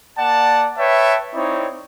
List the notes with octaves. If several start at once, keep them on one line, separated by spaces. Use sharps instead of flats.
A#3 D5 F#5 A5
B4 C#5 E5 G5 A5
C4 D#4 E4 C#5 D5